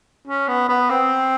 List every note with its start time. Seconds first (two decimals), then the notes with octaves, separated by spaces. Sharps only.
0.27 C#4
0.48 B3
0.69 B3
0.90 C4